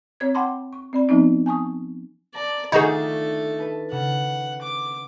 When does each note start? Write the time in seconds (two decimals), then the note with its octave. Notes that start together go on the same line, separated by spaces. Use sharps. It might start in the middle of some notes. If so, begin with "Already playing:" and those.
0.20 C4 C#5 G#6
0.34 F#5 G5 A5 B5 C6 D6
0.73 C#6
0.93 C4 D5 B5
1.09 F3 B3 C4 D#4
1.46 G#5 A5 C#6 D#6
2.34 D5 A5 A#5
2.72 D#3 A3 D4 D#4 F4 F#4 G#4 A4
3.59 B4 A5
3.92 C#3 F#5
4.62 D6